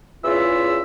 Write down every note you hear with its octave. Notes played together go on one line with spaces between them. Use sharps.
E2 C#3 E3 F4 E5 E6